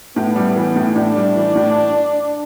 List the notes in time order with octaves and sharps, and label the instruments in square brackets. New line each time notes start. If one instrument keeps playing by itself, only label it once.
[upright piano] A2 [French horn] B3
[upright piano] G3
E3
A2
[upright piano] A2 [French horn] D4
[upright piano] G3
E3
A2